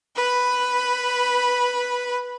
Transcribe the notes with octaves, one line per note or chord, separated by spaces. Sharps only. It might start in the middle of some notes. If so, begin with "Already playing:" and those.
B4 B5